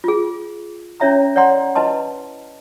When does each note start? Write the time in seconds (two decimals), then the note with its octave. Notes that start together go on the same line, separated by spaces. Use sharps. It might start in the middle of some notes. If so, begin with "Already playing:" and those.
0.04 F4 G#4
1.00 C#4 E4 C#5 E5 A#5 B5
1.36 C#5 D5 F#5 A#5 C6
1.75 E4 B4 D#5 A5 C6